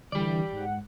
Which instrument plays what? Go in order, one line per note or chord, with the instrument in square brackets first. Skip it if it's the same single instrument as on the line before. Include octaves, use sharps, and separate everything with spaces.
[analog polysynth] D3 E3 G3 [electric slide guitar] G4 D5
[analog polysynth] G#2 F#5